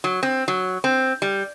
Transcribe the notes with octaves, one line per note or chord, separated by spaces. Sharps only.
F#3
C4
F#3
C4
G3